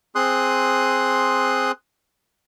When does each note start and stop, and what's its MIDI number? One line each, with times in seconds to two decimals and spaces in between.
0.15 1.72 60
0.15 1.72 68
0.15 1.72 84
0.15 1.72 87
0.15 1.72 90